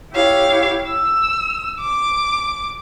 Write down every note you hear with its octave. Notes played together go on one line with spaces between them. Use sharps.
E4 G4 C#5 F5
E6
D6